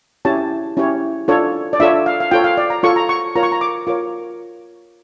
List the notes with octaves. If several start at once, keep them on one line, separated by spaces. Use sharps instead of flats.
C#4 E4 G4 C#5 A5
C#4 E4 G4 C#5
D4 F4 A4 C#5
D5
D4 F4 A4 C#5 E5
F5
F5
F4 A4 C#5 G5
F5
D5
A#5
F4 A4 C#5 C#6
A#5
C#6
F4 A#4 C#5 A#5
C#6
A#5
D6
F4 A#4 C#5 D6